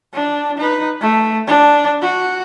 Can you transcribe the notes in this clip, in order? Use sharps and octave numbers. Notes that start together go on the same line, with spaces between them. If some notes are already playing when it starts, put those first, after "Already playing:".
D4
D#4 B4
A3
D4
F#4